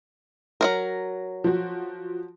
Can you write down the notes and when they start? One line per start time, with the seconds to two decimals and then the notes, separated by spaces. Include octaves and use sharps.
0.61 F#3 A#3 A#4
1.44 F3 F#4